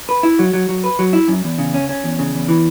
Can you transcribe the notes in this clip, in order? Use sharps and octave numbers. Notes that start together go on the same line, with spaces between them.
B4
E4
F#3
F#3
F#3
B4
F#3
E4
F#2
E2
C#3
C#4
C#4
E2
C#3
E2
E3